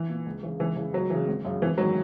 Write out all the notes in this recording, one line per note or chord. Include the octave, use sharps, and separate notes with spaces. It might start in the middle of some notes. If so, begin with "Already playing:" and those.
Already playing: E3
A#2
C#2
C#3 E3
C#2 E3
C#3 E3
C#2 F#3
C#3 E3
G#1
F#2 C#3
G#1 E3
G#2 D#3 F#3